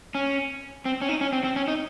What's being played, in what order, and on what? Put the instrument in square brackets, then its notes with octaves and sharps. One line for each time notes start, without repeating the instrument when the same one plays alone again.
[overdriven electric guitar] C#4
C4
C#4
D#4
C#4
C4
C4
C#4
D#4